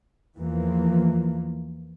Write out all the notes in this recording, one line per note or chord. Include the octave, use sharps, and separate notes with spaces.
E2 E3 F3 A#3